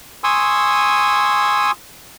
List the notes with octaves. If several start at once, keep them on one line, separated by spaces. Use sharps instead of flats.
G#5 C6 C#6 D#6 E6